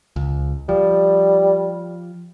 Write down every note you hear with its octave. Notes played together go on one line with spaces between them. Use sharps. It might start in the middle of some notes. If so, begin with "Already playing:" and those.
C#2
F3 G3